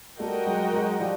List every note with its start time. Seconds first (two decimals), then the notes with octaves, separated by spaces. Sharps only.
0.19 G3 A3 F#4 A#4 D#5 G5
0.46 F#3 G#3
0.73 F#3 G#3
1.00 F3 G3